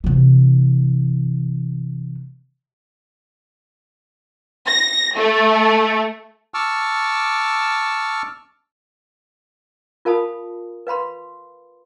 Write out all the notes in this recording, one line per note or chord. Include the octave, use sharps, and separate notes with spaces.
C3 E3
A#6
A3
A5 C#6 D6 E6 F6
F4 A#4 F5 A5 B5 D#6
B4 F5 B5 C6